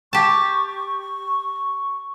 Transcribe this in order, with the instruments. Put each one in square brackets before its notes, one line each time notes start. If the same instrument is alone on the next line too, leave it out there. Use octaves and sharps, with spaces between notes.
[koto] G4 A5 [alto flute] C#6